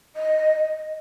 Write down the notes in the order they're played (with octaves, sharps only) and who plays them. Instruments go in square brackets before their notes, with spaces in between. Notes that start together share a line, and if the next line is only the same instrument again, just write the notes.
[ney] D#5